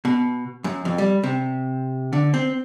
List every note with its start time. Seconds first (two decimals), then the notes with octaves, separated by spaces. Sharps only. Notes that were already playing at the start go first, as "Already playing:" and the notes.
0.05 B2
0.64 F#2
0.85 F2
0.98 G3
1.23 C3
2.13 D3
2.34 C4